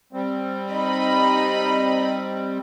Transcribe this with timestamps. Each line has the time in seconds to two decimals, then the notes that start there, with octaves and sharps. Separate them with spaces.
0.13 G3 C4
0.71 D#4 D#5 B5